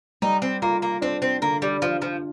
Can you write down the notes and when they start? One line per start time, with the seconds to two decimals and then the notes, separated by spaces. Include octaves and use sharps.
0.22 G3 D#4
0.42 C4
0.62 A#3 F4
0.82 A#3
1.01 C4 D4
1.22 C4
1.42 D3 A#3
1.62 G3
1.82 F3 F4
2.02 F3